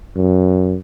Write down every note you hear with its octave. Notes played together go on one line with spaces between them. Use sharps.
F#2